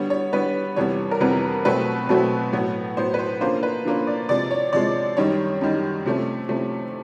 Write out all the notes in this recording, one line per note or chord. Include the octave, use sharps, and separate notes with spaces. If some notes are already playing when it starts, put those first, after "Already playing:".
Already playing: D3 G3 B3 C#5
C#5
D3 G3 B3 B4
F2 C3 E3 G3 B3 C#5
A#4
F2 C3 E3 G3 B3 B4
B2 F#3 A3 C4 B4
B2 F#3 A3 C4
A2 F#3 B3
A2 F#3 B3 C5
B4
C5
D3 F3 A#3 C#4 C5
B4
D3 F3 A#3 C#4
D5
C3 F3 G#3 D5
C#5
C3 F3 G#3 D5
F#2 D#3 G3 C#5
F#2 D#3 G3
C3 F3 A3 C#4
C3 F3 A3 C#4